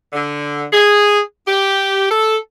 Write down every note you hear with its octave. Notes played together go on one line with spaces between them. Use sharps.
D3
G#4
G4
A4